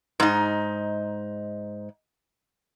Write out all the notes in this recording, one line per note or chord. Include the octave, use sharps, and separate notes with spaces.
G#2 D#4